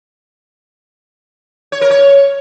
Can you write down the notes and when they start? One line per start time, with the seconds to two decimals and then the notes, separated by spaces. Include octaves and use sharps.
1.72 C#5
1.81 A#4
1.91 C#5